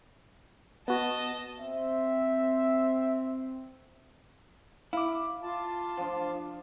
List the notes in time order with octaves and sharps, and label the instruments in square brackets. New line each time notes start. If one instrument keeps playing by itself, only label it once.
[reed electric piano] B3 F#4 [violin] D#5 A5
[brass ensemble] C4 [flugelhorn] E5
[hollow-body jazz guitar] E4 [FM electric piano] F5 D6
[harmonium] F4 A5
[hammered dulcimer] F3 D4